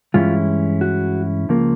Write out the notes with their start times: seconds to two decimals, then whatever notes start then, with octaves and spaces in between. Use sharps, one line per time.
0.14 G2 E3 G#3 C#4 E4 F4
0.81 F#4
1.49 C#2 C#3 F3 A#3